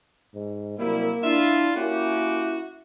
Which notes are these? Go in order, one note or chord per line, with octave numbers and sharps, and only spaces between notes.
G#2
C2 F#3 G3 A#3 E4
D4 E4 F4 E5
A#3 C#4 E4 F#4 G4